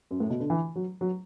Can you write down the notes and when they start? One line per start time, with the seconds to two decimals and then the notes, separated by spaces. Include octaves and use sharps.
0.11 F#2
0.20 A2
0.30 B2
0.40 D3
0.50 E3
0.76 F#3
1.01 F#3